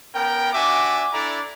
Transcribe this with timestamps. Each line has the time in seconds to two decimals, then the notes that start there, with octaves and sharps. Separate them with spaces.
0.14 B3 C#4 A#4 G5
0.53 D4 F#4 E5 G#5 D6
1.13 D4 E4 A4 D5 A#5